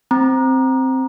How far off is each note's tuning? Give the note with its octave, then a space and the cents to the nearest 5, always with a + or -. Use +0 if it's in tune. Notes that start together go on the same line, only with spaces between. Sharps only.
C4 +0 A#5 +15